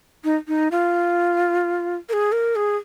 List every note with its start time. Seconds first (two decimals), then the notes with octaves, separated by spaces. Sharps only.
0.24 D#4
0.48 D#4
0.71 F4
2.09 A#4
2.13 G#4
2.32 A#4
2.56 G#4